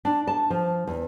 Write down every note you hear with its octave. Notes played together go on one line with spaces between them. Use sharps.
D4
A5
F3
E2